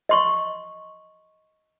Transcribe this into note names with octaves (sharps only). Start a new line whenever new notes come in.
D#5 C6 C#6